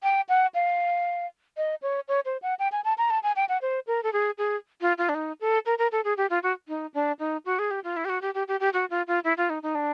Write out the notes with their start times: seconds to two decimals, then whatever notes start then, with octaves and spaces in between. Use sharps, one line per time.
0.03 G5
0.29 F#5
0.54 F5
1.57 D#5
1.82 C#5
2.08 C#5
2.25 C5
2.42 F#5
2.59 G5
2.72 G#5
2.84 A5
2.98 A#5
3.10 A5
3.23 G#5
3.36 G5
3.49 F#5
3.62 C5
3.87 A#4
4.03 A4
4.13 G#4
4.38 G#4
4.81 F4
4.98 F4
5.09 D4
5.14 D#4
5.41 A4
5.66 A#4
5.78 A#4
5.92 A4
6.04 G#4
6.17 G4
6.30 F4
6.43 F#4
6.68 D#4
6.94 D4
7.19 D#4
7.46 F#4
7.59 G#4
7.71 G4
7.84 F4
7.96 E4
8.05 G4
8.09 F#4
8.22 G4
8.34 G4
8.48 G4
8.60 G4
8.73 F#4
8.90 F4
9.07 F4
9.24 E4
9.37 F4
9.50 D#4
9.63 D#4
9.75 D4